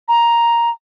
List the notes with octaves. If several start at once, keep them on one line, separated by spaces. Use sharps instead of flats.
A#5